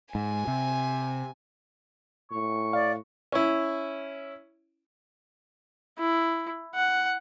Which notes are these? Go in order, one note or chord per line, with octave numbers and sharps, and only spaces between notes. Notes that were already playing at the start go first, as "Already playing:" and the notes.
G#2 G#5
C3
A2 C#6
D5 F5
C#4 E4
E4
F#5